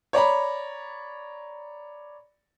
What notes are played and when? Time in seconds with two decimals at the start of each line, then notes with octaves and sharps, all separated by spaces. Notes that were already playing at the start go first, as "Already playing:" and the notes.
0.13 C#5 D5 A#5 B5